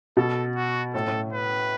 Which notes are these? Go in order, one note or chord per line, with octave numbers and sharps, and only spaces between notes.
B2 A4
F#4
A2 A4
A2
B4